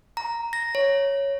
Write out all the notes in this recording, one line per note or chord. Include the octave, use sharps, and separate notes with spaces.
A#5
A#6
C#5